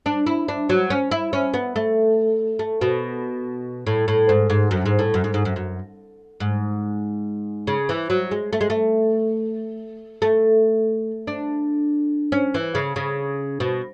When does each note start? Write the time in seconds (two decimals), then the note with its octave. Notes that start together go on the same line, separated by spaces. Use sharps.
0.06 D4
0.27 E4
0.48 D4
0.69 F#3
0.90 C#4
1.11 E4
1.33 C#4
1.54 B3
1.76 A3
2.59 A3
2.81 B2
3.87 A2
4.08 A2
4.29 G#2
4.50 G#2
4.71 F#2
4.86 G#2
4.99 A2
5.14 F#2
5.24 G#2
5.34 G#2
5.45 F#2
5.56 F#2
6.40 G#2
7.67 C#3
7.89 E3
8.10 F#3
8.31 G#3
8.53 A3
8.61 G#3
8.70 A3
10.22 A3
11.27 D4
12.32 C#4
12.54 E3
12.75 C#3
12.96 C#3
13.60 B2